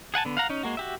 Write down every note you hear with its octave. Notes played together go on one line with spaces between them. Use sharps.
G#4 F#5 G#5 A5
D3 B3
F5 F#5 A#5
C#4 D#4
G#3 A#3 F#4
F#4 G4 E5